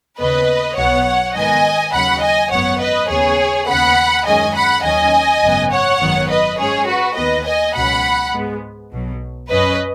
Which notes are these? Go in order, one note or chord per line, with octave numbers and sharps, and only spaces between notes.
D#2 C#3 B3 B4 D#5
B1 B2 F#3 B3 C#5 F#5
G#2 D#3 B3 D#5 G#5
D#2 C#3 F#3 C#4 F#5 B5
D#5 G#5
G#1 F#2 F#3 B3 C#5 F#5
B4 D#5
D#2 C#3 B3 G#4 C#5
D#2 C#3 B3 F#5 B5
F#2 D#3 G#3 C#4 D#5 G#5
F#5 B5
D#2 D#3 F#3 C#4 D#5 G#5
G#1 F#2 C#3 B3
C#5 F#5
G#1 F#2 D#3 F#3 B3
B4 D#5
G#2 G#3 C#4 G#4 C#5
F#4 B4
D#2 D#3 B3 B4 D#5
D#5 G#5
C#2 B2 F#3 C#4 F#5 B5
G#2 G#3 B3
B1 B2 F#3
F#2 F#3 C#4 B4 D#5